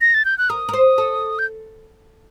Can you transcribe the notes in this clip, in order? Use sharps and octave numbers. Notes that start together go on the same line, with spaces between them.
A#6
A6
G6
F#6
A#4 D#6
A#4
C5
A4
G6